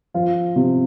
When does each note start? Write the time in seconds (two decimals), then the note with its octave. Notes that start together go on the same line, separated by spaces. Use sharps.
0.14 F3 F4
0.56 C3